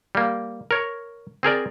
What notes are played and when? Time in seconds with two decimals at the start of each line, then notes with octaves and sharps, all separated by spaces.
0.15 G3 A#3
0.71 A#4 C#5
1.43 C4 G#4 A#4 D5